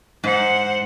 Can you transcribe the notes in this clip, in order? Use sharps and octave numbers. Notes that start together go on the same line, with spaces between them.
G#2 C5 F#5